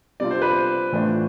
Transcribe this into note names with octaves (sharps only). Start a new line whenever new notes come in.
C3 G3 D4 F4 D5
C5
B4
C5
A2 E3 A3 D4 F4